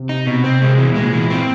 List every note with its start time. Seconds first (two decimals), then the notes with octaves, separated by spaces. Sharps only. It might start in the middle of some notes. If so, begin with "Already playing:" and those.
Already playing: C3
0.09 D#4
0.27 B2
0.44 C4
0.61 G#3
0.78 E3
0.89 B2
0.96 A#2 G#3
1.13 E3
1.30 C4